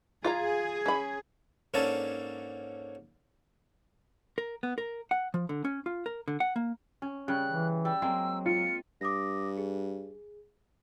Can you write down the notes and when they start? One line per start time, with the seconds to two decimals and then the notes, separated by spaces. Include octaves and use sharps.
0.24 F4 G#4 F5 A#5
0.86 C#4 B5
1.74 G#2 A#3 C#4 D4 A4 A5
4.38 A#4
4.63 B3
4.78 A#4
5.11 F#5
5.34 F3
5.49 D3
5.65 C#4
5.86 F4
6.06 A#4
6.28 D3
6.40 F#5
6.56 A#3
7.02 C#4
7.28 C#3 G3 F#6
7.50 E3
7.85 G3 E6
8.02 F#3 G#3 A#3 C4
8.46 F4 C#7
9.01 G2 D6 D#6 A#6
9.57 G#4